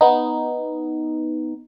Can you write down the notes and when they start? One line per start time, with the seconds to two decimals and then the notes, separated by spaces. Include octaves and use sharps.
0.01 B3 D#4